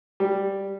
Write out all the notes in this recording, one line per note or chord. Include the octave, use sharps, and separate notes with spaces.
G3